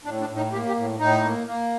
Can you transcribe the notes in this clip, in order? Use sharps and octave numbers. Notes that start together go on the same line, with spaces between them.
A2 D4
D4
A2
D#4
A#3 G4
G4
A2
A2 D#4
A#3
A#3